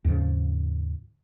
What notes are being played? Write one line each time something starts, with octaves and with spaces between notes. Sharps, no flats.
D#2 G#2 C#3 F3